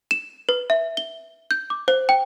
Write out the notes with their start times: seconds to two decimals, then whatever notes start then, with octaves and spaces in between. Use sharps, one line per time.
0.11 E7
0.49 B4
0.70 E5
0.97 G7
1.51 G6
1.70 D6
1.88 C5
2.09 G5